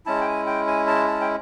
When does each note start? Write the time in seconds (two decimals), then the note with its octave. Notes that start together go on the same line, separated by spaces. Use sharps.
0.06 G#3 C#4 E4 A5
0.21 G5
0.27 G#5
0.47 G5
0.67 G#5
0.87 A5
1.07 A5
1.21 G5